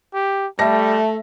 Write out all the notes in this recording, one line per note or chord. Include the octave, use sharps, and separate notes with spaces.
G4
G3 A3 E5 A5 A#6